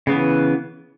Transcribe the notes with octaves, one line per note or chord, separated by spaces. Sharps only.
C#3 E3 B3